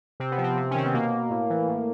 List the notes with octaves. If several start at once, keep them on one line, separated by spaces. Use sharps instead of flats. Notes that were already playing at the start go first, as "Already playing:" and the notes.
C3 C4
B3
F3
C4
C3
C#4
D#3 C4
B3
B2 A#3
A2
E3
A2